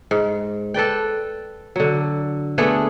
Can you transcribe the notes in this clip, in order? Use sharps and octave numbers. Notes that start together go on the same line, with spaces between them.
G#2
A4 B4 D5 G5
D3 F#3
A3 B3 D4 G#4